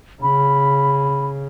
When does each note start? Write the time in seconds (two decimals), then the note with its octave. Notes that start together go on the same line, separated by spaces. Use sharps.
0.22 C#3 B5